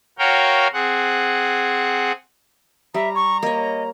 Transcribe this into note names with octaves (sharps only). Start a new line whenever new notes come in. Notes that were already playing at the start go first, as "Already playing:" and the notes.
F#4 A#4 C#5 F5 G5
C4 G#4 F#5
G3 E5 A#5
C#6
A#3 C#5 D#5